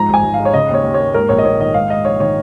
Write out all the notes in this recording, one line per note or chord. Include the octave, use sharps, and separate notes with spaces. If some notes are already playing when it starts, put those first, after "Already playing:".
Already playing: G#2 F3 A#5
G#1 G#5
G#1
F5
G#3
C#5
C#3 D#5
D#2
C#5
D#2
A#3 C#5
G#2 A#4
A#1 C#5
D#5
A#1 C#5
D#3 D#5
G#2 F5
G#3 D#5
A#1 C#5
D#3 C#5